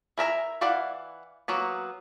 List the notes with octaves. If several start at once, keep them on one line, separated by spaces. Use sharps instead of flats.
E4 A#4 E5 A#5
E3 E4 D5 F5 F#5
F#3 A#3 B3